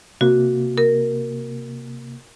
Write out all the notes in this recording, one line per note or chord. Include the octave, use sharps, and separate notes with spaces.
C3 A#3 F#4
A#4